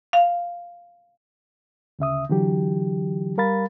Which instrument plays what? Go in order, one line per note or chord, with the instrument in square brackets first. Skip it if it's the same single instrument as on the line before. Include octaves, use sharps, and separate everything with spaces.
[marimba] F5
[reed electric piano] D2 C#3 E5 D#6
D3 E3 F#3 G4
G3 A#4 F5 B5 A6